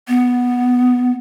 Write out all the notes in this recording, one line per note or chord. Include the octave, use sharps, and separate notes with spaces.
B3